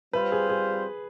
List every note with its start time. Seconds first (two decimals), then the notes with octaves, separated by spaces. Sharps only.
0.13 G3 C4 F4 B4 C5
0.32 G#4
0.49 G#4